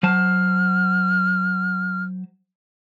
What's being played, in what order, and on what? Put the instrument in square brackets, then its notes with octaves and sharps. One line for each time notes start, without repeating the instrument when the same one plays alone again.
[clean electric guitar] F#3 C5 A5 [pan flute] F6